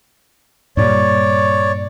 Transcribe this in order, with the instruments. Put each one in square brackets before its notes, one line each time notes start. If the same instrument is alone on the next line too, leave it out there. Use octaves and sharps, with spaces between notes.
[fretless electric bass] G2 A#2 G3 [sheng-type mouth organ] C#5 D5